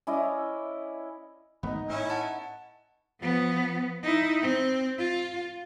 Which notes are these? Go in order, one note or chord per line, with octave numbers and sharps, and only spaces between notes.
C#4 E4 D5 D#5
G#1 A3 B3 D#4
A2 C#4 E4
F#5 A5
F3 B3
D#4 E4
C4
F4